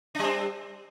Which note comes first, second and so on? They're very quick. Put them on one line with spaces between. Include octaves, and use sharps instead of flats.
D4 G3 C4